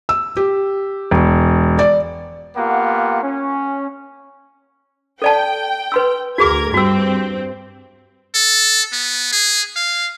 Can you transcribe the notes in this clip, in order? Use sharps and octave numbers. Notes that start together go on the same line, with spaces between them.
E6
G4
E1
D5
A#3 B3 F4 G4 F#5
C#4
A4 D5 G5 A5
B4 C6 E6
D2 F#4 G#4 A#4 D6 G#6
G2 C4 F#4 E6
A4
B3
G#4
F5